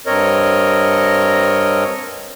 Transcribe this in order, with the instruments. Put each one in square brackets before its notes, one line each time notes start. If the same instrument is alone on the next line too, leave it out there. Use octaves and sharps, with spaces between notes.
[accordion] G2 C4 A#4 C#5 D#5